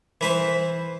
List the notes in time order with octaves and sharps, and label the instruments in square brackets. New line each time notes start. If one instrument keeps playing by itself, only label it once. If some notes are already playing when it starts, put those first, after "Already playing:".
[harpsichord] E3 B4 C5